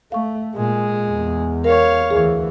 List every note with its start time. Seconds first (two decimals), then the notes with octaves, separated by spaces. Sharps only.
0.12 A3 F5 C#6
0.55 A#2 G#3 G#4
1.08 E2
1.64 A#4 C#5 F5
2.11 D2 E3 G#4